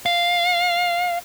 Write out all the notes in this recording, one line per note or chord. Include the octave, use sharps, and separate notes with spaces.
F5